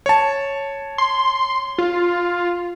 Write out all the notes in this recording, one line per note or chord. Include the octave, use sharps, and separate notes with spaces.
C#5 A5
C6
F4